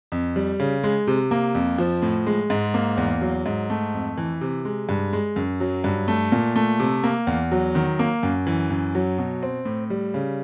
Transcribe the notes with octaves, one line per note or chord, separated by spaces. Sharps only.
F2
G3
C#3
G#3
C3
A#3
F2
F3
A2
G#3
G#2
A#3
E2
F#3
G#2
A3
F2
E3
C3
G#3
G2
G#3
F#2
F#3
G2
A3
A#2
A3
C3
A#3
E2
F#3
D#3
A#3
F#2
E3
F#2
F#3
B2
C4
A2
G3
C#3